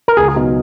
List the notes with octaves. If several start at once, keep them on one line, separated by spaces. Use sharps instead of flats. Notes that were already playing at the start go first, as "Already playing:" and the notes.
A#4
C#2 G#4
B2 F#3 B3 D#4